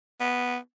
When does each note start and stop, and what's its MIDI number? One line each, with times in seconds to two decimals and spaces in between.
0.20 0.57 59